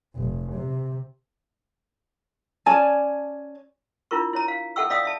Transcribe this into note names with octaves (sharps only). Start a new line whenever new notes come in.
F1
C3
C#4 D5 G#5 A5
D4 E4 F4 A#4 C#6
E4 C#5 A#5
F5
A4 E5 F#5 G5 C#6 E6
D5 E5 F5 G5 D#6 E6
D5 E5 A5